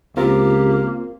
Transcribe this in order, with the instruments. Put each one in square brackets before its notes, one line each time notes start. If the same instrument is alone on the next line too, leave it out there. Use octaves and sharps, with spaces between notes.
[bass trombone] C#2 [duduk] A#3 [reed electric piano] C4 F4 A#4 [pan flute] G4